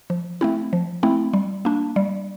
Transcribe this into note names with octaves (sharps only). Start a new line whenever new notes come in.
F3
A3 C4 E4
F3
A3 C4 E4
G3
A#3 D4
G3